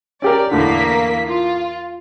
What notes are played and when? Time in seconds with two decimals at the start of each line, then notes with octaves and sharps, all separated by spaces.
0.22 C#4 G4 A#4 D5
0.51 E2 A2 D3 A#3 B6
1.27 F4